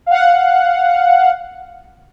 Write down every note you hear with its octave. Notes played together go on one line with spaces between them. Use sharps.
F5 F#5